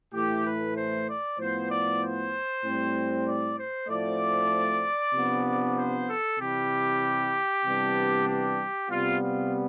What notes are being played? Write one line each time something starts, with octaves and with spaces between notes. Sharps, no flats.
A2 E3 A3 G4
B4
C5
D5
A2 F3 B3 C5
D5
C5
A2 G3 C4
D5
C5
A2 F3 A3 C4 D5
C3 F3 B3 D4
C5
A4
C3 E3 G3 G4
C3 E3 G3 B3 D4
G4
C3 G3 B3 F4
F4